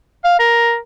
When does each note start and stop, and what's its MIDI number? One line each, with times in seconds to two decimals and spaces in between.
0.25 0.38 77
0.40 0.77 70